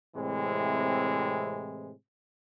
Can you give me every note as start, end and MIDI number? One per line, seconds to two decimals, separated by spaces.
0.16 1.90 45
0.16 1.90 48
0.16 1.90 52
0.16 1.90 56
0.16 1.90 60